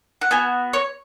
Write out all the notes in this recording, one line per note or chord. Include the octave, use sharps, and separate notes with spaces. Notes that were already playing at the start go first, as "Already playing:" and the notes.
F#5
B3 F#4 G#5
C#5